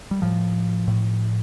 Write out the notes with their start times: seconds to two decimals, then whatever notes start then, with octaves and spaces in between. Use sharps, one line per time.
0.11 G3
0.22 A2 F3
0.88 A2